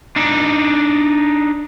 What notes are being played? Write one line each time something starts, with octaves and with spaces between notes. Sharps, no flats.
D4 D#4